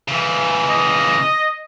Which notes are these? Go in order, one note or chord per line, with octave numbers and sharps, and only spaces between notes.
C#3 E3
D#5